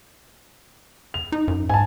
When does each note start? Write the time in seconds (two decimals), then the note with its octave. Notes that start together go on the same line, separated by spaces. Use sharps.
1.14 F7
1.32 D#4
1.48 F#2
1.69 G#2 G#5 A5